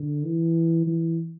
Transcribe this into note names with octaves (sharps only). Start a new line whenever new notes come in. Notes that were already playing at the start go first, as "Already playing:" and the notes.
Already playing: D3
E3
E3